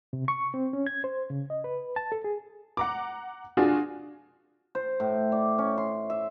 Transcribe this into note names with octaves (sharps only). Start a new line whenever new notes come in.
C3
C#6
C4
C#4
G#6
C5
C#3
D#5
B4
A5
A4
G#4
F#5 A#5 D6
D4 F4 F#4 G#4
C5
A2
D5
C#4
C6
E5